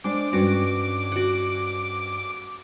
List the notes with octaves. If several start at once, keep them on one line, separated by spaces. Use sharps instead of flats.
G#3 D4 C5 D6
G2 C#4 F#4
F#4 F#5